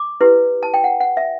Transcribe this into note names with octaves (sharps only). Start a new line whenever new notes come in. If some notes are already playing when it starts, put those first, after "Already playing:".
Already playing: D6
E4 G4 B4
A5
G5
F#5
F#5
E5